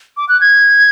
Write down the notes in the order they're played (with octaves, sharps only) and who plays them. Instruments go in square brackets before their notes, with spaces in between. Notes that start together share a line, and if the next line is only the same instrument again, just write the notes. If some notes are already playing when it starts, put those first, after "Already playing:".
[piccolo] D6
F#6
G#6